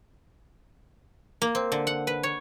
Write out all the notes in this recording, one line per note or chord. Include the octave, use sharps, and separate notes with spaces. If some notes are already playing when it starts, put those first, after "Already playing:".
A#3
C4
D3
F#5
B4
C#5